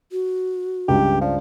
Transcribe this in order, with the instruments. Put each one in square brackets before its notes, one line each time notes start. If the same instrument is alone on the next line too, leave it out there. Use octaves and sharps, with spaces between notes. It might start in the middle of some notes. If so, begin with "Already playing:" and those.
[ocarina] F#4
[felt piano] C#2 G2 [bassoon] G4
[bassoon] F3 [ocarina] D5